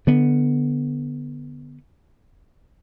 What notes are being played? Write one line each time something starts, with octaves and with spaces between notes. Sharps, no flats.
D3 B3